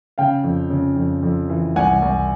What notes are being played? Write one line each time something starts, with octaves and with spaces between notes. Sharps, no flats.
C#3 F5 G5
F2
C#3
F2
F2
E3
C2 F#5 G#5
C2